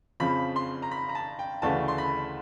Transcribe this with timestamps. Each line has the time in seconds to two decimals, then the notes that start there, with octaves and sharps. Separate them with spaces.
0.20 F2 C#3 F3 B5
0.56 C6
0.82 A#5
0.91 B5
1.09 A#5
1.15 A5
1.39 G5
1.62 D2 C#3 E3 A3 A5
1.88 C6
1.98 B5